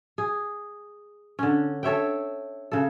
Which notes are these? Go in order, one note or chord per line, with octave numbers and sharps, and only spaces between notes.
G#4
D3 C#4
A4 C#5 E5 G5
C#3 A4